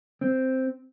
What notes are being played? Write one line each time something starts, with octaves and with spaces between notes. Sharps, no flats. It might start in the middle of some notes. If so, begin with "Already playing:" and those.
C4